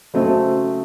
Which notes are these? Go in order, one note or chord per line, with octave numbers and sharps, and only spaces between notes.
C#3 F#3 A3 C4